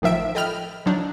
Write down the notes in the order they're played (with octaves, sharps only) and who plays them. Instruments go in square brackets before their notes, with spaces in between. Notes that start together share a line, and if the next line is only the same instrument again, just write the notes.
[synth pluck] A1 D#3 F3 E5 D7
A4 D#5 G5 B5 F6
F3 F#3 D4 D#4